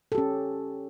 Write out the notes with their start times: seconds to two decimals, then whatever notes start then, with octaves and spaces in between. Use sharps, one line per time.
0.12 A4
0.15 G4
0.18 C#4